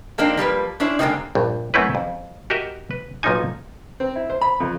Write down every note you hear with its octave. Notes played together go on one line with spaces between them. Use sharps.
F3 A#3 C4 D4 D#4
F3 G3 A#3 B4
C#4 D4 E4 C5
D3 G3 G#3 A#3 C4 D#4
A#1 G2
F#2 A3 C4 C#4 E4 B4
F2
F#4 G4 A#4 D#5 E5
B4
B1 A#2 F3 C#4 D#4 G#5
C4
E4
C5
B5
F2